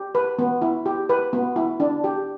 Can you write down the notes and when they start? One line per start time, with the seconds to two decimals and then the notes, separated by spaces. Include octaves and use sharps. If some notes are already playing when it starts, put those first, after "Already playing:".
Already playing: G4
0.15 B4
0.38 B3
0.62 E4
0.86 G4
1.09 B4
1.33 B3
1.56 E4
1.80 D4
2.04 G4